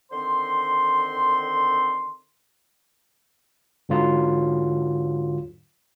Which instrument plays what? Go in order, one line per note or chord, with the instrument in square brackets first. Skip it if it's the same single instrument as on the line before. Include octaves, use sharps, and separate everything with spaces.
[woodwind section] D3 D#3 C4 C5 C6
[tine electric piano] G#2 D3 F#3 F4